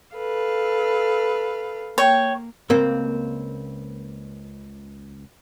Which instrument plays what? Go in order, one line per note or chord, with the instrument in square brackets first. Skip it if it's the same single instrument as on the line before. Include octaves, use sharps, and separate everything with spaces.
[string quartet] A4 B4 F5
[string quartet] A#3 [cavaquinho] C#5 G5
[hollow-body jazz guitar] C#2 C4 [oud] A#3